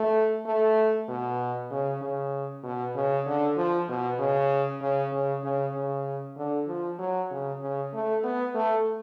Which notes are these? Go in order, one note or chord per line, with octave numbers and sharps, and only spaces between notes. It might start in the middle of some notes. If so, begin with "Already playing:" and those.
Already playing: A3
A3
B2
C#3
C#3
B2
C#3
D3
F3
B2
C#3
C#3
C#3
C#3
C#3
D3
F3
F#3
C#3
C#3
A3
B3
A3